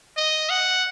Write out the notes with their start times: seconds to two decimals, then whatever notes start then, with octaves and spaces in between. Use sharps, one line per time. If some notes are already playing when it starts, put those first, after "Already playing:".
0.17 D#5
0.50 F#5